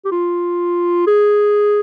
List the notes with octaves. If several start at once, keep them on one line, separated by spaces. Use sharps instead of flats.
G4
F4
G#4